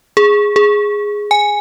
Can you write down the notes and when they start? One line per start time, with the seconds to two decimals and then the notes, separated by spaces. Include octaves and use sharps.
0.17 G#4
0.56 G#4
1.31 G#5